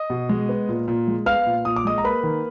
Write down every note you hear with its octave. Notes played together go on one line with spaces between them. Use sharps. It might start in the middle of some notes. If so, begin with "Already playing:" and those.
Already playing: D#5 D#6
B2
G#3
B3
A#2
A#2
G#3
B3 F5 F6
A#2
A#2 D#6
D6
G#3 D#5 D#6
A#5
A#3 B4 B5
D#3